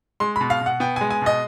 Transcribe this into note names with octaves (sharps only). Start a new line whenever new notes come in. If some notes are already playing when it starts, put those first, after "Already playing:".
G#3 C6
B2 B5
F5
B2
F#5
B3 G5
G#3 G#5
G#5
B2 D#5